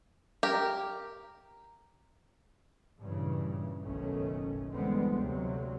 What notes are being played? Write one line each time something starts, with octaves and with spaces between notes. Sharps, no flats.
G4 A#4
G2 A#2 C#3 E3
F#1 B1 B2 D#3 A3 C#4
D3 E3 G3 G#3 B3 C4
D2 C3 F#3